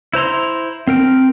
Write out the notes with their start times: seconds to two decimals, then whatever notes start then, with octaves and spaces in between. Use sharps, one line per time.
0.14 E4 C5 A#5 C6
0.87 C4 A#4 G5